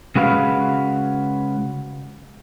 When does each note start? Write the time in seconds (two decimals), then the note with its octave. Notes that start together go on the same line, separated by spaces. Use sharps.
0.16 C#3 G#3 F#4 B4 E5 F5